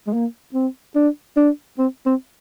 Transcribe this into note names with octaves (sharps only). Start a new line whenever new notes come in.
G#3
A#3
C4
D4
D4
C4
C4